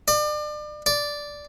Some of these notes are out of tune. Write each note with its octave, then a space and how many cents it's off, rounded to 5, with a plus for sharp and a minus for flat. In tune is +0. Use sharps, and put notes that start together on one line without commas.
D5 +35
D5 -5